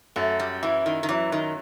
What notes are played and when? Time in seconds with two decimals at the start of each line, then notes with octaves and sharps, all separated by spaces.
0.16 F#2 A3
0.39 G3
0.63 E3 E4
0.86 D#3
1.03 D#3
1.09 E3 F#3
1.32 D#3